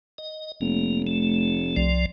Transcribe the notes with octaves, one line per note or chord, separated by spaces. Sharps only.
D#5
F1 A#3
A3
C2 F3 D5